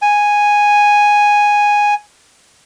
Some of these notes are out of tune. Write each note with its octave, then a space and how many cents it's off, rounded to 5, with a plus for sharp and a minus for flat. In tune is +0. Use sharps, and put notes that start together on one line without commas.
G#5 -5